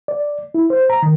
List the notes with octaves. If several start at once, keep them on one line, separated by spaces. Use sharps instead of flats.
D5
E4
C5
A#5
D#3